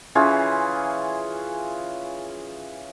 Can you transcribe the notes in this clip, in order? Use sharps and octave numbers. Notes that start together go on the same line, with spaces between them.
E3 C#4 F4 G#4